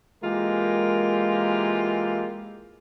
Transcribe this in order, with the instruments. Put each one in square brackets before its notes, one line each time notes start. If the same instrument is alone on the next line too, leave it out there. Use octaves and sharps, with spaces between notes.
[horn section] E3 G#3 A#3 F4 G4 A#4